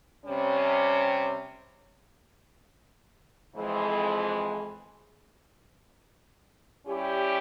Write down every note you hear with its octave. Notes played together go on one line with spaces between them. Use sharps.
C3 G3 C#4
F2 E3 G#3
G3 C#4 E4 G4